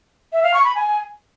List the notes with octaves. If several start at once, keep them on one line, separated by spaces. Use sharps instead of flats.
E5
F5
C#6
B5
G#5